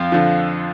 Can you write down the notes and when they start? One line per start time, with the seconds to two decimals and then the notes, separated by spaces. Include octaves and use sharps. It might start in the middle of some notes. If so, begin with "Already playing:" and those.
Already playing: F2 F3 F4
0.12 D3 F3